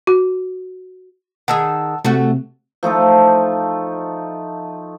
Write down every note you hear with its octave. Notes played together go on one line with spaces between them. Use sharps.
F#4
D#3 D#4 G#4 F#5 A5 E6
C3 A3 C4 F#4
F3 A3 D#4 A4